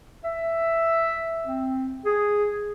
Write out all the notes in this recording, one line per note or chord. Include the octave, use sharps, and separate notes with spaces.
E5
C4
G#4